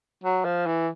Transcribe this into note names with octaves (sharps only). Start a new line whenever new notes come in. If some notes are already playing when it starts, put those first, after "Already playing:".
F#3
F3
E3